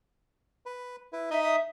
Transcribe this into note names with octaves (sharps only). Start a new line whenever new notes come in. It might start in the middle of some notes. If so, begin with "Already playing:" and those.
B4
E4 B4
D#4 D#5 E5 D#6
E5